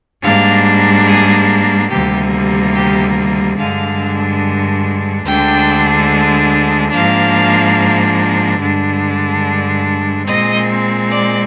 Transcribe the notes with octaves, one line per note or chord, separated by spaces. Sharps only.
G#2 G3 A#3 D4 F5
G#4
D2 C3 D#3 G3 A#3 G4
G4
G2 D3 G#3 D4 F5
D2 D3 G#3 D4 G5
G#2 F3 A#3 D4 F5
G2 D3 G#3 D4
A#2 G#3 C4 D#5
D5